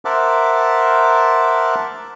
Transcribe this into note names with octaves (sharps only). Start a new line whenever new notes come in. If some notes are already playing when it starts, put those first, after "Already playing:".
A#4 C5 E5 F#5 A5 D6